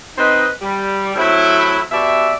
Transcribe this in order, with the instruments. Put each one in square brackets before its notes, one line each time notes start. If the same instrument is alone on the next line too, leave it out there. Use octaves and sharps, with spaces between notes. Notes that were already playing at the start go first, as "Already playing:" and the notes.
[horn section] C4 D#4 B4 C5 D#5
G3
A2 C3 F#3 C4 E4
B2 G4 D5 E5